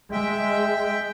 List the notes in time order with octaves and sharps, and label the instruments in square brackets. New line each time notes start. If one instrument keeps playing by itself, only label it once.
[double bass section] G#3 [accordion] E5 G5